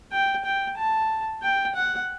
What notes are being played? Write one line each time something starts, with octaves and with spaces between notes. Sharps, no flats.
G5
G5
A5
G5
F#5